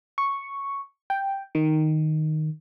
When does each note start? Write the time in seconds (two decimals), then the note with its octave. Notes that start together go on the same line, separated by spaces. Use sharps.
0.18 C#6
1.10 G5
1.55 D#3